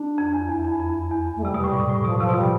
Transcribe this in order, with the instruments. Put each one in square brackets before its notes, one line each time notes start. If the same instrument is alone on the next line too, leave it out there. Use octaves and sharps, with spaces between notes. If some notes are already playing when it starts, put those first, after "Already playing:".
Already playing: [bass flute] D4
[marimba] F2
E2
[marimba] E2 [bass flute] E4
[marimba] F2
F2
E2
[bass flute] A3
[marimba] C3 [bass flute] G3
[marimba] B2 [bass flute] G3
[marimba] A2
G2
A2
[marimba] B2 [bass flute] F3
[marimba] C3 [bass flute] F3
[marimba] B2
[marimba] C3 [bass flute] G3